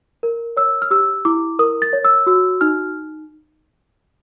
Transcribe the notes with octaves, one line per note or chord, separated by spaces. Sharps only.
A#4
C#5 E6
F6
G4 E6
E4 D6
A#4 D#6
A6
C#5
E6
F#4 E6
D#4 F6